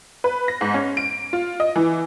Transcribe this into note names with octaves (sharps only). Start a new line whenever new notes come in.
B4
A#6
G#2
C#4
D7
F4
D#5
E3